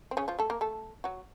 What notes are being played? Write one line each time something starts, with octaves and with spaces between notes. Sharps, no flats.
C4
C#3 C#4
F3 F4
A3 A4
A#3 A#4
A3 A4
F#3 F#4